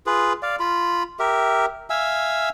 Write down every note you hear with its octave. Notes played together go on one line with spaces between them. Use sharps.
F4 G#4 B4
D5 F5
F4 B5
G4 A#4 E5
E5 F5 G#5 E6